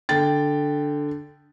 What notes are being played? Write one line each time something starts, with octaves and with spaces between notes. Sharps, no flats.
D3 G5 A6